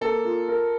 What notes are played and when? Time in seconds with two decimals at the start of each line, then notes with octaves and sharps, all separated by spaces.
0.01 A#3 A4
0.25 F4
0.48 A#4